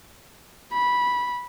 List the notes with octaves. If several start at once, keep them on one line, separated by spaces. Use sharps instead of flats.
B5